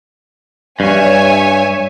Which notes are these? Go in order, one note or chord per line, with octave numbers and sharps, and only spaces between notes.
G2 C#5 E5 G#5